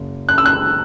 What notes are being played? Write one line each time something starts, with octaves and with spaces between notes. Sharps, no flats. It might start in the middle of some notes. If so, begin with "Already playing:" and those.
Already playing: F#1
F#6
E6
F#6